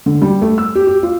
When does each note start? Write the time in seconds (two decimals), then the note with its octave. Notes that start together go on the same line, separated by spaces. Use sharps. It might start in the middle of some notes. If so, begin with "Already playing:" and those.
0.06 D3
0.22 G3
0.42 A3
0.58 E6
0.75 G4
0.87 G4
1.03 F4